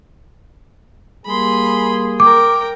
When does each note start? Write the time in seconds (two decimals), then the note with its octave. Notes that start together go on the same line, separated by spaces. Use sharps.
1.26 G3 A#3 G#4 B5 C6
2.20 A#4 G5 D6